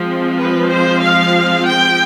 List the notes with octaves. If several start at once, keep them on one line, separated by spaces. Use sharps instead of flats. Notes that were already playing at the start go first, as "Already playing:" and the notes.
Already playing: F3 G#3 C4
B4
C5
F5
G5